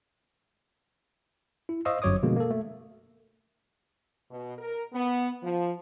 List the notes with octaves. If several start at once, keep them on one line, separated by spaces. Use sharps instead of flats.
E4
C5 D#5 F5 C#6 D#6 E6
G1 F#2 F#3 C#5 D6 D#6
B2 D3 F3 G#3 A#3
A#3 A4
A3
B2
A#4
B3
F3